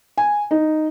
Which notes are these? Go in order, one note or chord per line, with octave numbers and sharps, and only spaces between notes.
G#5
D#4